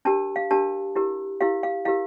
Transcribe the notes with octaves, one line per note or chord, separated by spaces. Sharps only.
D4 G4 A#4 A5
F5
D4 G4 A#4 A5
E4 G4 A#4
E4 G4 A#4 F5
F5
E4 G4 A#4 F5